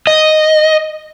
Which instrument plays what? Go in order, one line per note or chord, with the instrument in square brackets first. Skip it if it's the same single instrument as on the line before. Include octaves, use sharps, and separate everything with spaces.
[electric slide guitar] D#5